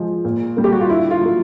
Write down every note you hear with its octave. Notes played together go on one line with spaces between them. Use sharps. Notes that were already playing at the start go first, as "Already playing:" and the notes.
Already playing: F3 G#3
A#2
G3 A#3
G4
F#4
F4
D3 E4
F4
F#3 A#3